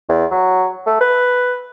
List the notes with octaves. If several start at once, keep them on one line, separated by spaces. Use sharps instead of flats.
E2
F#3
A3
B4